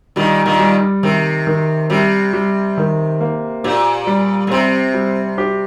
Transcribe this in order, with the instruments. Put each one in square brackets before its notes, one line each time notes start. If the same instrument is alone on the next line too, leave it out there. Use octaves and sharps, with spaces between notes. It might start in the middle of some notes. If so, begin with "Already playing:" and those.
[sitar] A#2 D#3 [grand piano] G3
[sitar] A#2 D#3
[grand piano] G3
[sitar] C3 [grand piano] D#3
[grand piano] D#3
[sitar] C3 [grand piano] G3
[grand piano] G3
D#3
A#3
[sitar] A#2 [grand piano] G4
[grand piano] G3
[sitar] A#2
[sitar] C3 [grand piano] C4
[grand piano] G3
G4